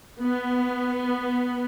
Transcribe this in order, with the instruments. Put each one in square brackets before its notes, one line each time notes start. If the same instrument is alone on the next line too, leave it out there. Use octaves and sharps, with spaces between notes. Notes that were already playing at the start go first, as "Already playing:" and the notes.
[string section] B3